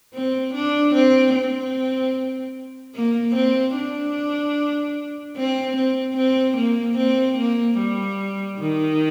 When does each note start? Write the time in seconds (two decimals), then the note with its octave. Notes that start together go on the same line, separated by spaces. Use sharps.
0.14 C4
0.54 D4
0.95 C4
1.34 C4
2.95 A#3
3.35 C4
3.76 D4
5.37 C4
5.77 C4
6.17 C4
6.57 A#3
6.98 C4
7.38 A#3
7.78 G3
8.59 D#3